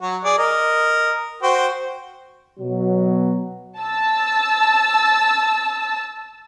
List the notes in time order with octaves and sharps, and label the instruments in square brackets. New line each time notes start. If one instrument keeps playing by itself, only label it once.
[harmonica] F#3 F#4
G#4 D5
A#4 D#5
F#4 C5 G5
[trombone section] B2 F#3
[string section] A5 E6